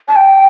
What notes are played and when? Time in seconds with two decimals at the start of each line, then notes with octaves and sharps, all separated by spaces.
0.08 A5
0.16 G5